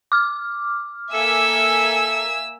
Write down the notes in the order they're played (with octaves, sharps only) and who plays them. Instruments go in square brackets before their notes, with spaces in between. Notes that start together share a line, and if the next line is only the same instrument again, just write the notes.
[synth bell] D6 F6
[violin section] A#3 E5 G#5 [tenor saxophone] A4 [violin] E6